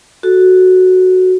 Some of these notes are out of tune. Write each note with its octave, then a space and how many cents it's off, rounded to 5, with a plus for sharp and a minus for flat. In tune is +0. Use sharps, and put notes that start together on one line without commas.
F#4 +0 A4 +0